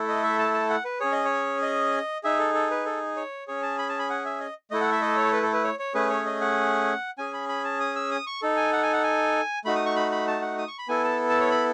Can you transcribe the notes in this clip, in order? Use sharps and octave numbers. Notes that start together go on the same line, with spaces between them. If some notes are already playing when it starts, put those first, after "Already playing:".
Already playing: A3 E4 A4
D#5
E5
A5
A5
F#5
B4
C#4 G#4 C#5
D#5
C#5
D#5
D#4 G#4 E5
A4
A4
B4
A4
C#5
C#4 G#4 C#5
A5
B5
A5
B5
F#5
E5
D#5
A3 E4 A4 D#5
F#5
E5
D#5
C#5
B4
A4
B4
C#5
C#5
A3 C#4 G#4 B4
C#5
D#5
F#5
C#4 G#4 G#5
B5
B5
A5
D#6
E6
D#6
C#6
D#4 A4
G#5
F#5
G#5
F#5
G#5
A3 D#4 F#4 B5
D#6
C#6
B5
B5
A5
F#5
D#6
C#6
B5
B3 E4 A4 G#5
A5
A5
C#5
B5